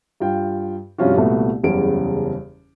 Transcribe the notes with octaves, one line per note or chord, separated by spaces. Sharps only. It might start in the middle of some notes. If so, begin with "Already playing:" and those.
G2 F4 G5
G2 C3 F3 C#4 F4 F#4
C2 A#2 A3 B3 F#4
F#1 E2 C#3 G3 D7